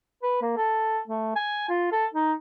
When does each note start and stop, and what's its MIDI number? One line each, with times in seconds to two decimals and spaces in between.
0.23 0.40 71
0.42 0.53 58
0.57 1.00 69
1.08 1.33 57
1.36 1.69 80
1.69 1.92 65
1.92 2.06 69
2.14 2.33 63